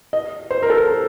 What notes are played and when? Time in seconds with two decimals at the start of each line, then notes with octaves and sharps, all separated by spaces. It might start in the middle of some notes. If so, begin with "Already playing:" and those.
0.13 D#5
0.51 C5
0.63 A#4
0.70 A4